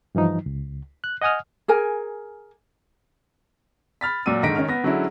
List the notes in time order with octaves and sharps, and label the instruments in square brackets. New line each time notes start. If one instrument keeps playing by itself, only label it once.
[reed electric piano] G2 E3 F3 D#4
C#2
F#6
D#5 F#5 G#5 D#6 F6
[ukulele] G#4 A#4 G#5
[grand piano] B5 F6 A6 B6
A#2 F#3 D5 E6 D#7
G#2 D3 D#3 A#6 B6 D7
D#3 C#4 F6
B3 A#6
D3 F#3 G#3 C#4 E4